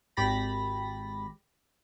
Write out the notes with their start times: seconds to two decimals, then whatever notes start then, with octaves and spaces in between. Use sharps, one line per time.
0.17 G#1 G4 B5 A6 A#6